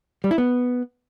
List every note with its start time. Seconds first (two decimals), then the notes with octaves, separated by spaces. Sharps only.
0.24 G3
0.31 E4
0.38 B3